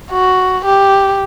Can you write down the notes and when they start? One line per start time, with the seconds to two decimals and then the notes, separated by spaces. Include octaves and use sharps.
0.11 F#4
0.65 G4